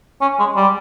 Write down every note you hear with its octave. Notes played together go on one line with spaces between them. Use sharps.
C#4
G#3
G3